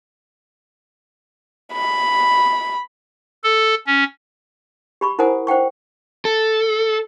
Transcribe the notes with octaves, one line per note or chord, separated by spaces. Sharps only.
B5
A4
C#4
G4 B5 C#6
E4 A#4 C5 F#5 G#5 D#6
C5 F#5 G5 C#6
A4